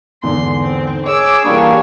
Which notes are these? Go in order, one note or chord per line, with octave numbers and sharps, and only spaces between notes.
E2 G#2 D3 C6
C4
G#4 C#5 D6 E6
E3 G3 A#3 D4 C#5 G#5 B5